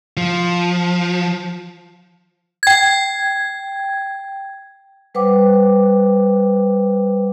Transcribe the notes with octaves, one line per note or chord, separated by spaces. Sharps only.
F3
G5 G#6
G3 B4 C5 F#5 G5 D6